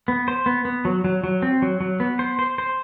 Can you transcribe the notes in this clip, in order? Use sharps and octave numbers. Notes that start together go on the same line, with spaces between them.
B3
C5
B3
B3
F#3
F#3
F#3
C4
F#3
F#3
B3
C5
C5
C5